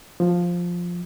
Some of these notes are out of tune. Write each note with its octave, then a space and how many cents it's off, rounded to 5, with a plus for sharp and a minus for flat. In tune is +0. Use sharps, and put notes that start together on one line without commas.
F3 +5